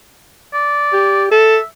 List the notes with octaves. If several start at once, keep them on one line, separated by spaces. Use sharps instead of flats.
D5
G4
A4 E5